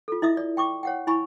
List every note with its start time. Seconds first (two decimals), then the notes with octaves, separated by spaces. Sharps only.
0.08 F4 A4
0.22 E4 D#5 E5 D#6
0.37 D5
0.57 G5 C#6 D6
0.83 C#5 F#5 G5
1.07 E4 G#5 B5 C#6